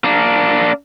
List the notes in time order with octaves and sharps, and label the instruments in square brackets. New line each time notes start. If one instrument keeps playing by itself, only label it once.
[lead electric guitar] A#3 D4